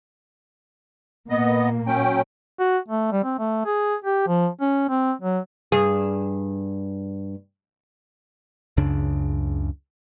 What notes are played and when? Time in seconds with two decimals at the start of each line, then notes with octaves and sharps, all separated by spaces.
1.30 A#2 A#3 B3 D#5
1.87 F#3 C#4 G5
2.59 F#4
2.88 A3
3.12 G3
3.24 C4
3.39 A3
3.65 G#4
4.04 G4
4.27 F3
4.61 C#4
4.89 C4
5.22 F#3
5.72 G2 G#4
8.77 C#2 F#2 C#3 D4